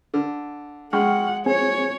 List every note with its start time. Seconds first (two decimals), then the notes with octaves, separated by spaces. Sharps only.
0.14 D3
0.93 G#3 F#5 G5 C#6 F6
1.46 C4 G#4 C#5 G#5